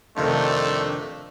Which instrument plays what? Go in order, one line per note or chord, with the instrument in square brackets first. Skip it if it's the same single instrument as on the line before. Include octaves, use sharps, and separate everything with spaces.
[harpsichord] F2 C3 D#3 [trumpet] A3 [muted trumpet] D4